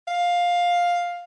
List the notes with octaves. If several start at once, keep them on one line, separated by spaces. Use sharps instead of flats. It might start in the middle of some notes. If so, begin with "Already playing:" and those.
F5